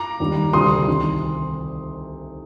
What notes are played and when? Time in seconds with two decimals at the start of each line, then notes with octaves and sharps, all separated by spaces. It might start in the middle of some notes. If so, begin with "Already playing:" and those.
Already playing: A#5 D6
0.20 D#2 D#3 G3
0.53 D2 C3 G3 C6 D#6
0.88 C2 C3 D#3